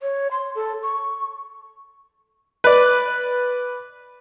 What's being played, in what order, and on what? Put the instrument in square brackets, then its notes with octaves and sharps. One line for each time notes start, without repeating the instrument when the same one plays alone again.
[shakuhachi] C#5
C6
A4
C#6
[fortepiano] B4 D5